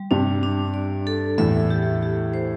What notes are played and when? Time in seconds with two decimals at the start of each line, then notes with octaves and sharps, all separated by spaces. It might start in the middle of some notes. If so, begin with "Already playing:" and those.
Already playing: G3
0.11 G2 C3 D4
0.43 D4
0.74 D5
1.07 A4
1.38 E2 A2 E5
1.70 G4
2.03 G4
2.34 C5